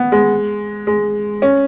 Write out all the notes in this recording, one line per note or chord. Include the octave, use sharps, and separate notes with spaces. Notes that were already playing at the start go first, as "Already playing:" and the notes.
Already playing: B3
G#3
G#3
C#4